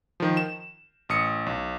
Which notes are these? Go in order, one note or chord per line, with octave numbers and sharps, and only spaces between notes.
D#3 F3
E7
A1 D#6 C#7
B1